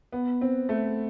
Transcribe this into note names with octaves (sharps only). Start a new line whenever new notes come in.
B3
C4
A3